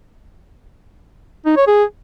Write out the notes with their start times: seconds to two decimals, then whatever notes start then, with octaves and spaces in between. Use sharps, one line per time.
1.46 D#4
1.57 C#5
1.67 G#4